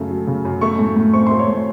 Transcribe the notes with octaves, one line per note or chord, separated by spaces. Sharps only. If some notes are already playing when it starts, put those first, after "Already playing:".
Already playing: F#2 C#3 A3
F#3
C#3
F#2
A3 C#6
A2
A2
C4 C#6
C6
A3
C#5
A2